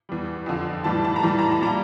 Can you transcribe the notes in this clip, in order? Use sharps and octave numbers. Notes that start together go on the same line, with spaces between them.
E2 E3 G3
F2 D3 F3
A2 E3 G3 A5
A5
A#5
A2 E3 G3 A5
A#5
A5
A#2 G3 A#5